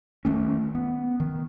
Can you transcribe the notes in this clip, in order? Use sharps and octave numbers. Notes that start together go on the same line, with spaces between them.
D#3 E3 A3 C#4
B3
D#3